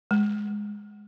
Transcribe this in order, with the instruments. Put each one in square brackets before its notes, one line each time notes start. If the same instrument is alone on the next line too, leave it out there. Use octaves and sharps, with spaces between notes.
[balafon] G#3